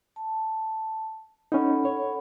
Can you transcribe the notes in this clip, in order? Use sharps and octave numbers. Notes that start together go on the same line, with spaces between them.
A5
C#4 D#4 A4 F#5 B5
C#5